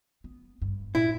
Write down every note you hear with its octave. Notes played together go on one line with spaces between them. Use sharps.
B3
G2
A#2 E4